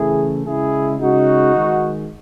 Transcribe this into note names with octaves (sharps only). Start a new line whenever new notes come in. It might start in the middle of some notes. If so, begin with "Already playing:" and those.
Already playing: C#3 E3 A3 E4 G#4
C#3 G#3 E4 G#4
C#3 G#3 D#4 F#4
D#3 G#3